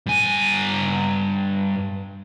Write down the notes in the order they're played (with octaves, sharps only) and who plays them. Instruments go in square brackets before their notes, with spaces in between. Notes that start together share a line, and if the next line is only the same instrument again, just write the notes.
[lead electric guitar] G2 G#5